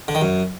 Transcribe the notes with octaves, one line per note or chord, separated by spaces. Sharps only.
D3
D#3
F#2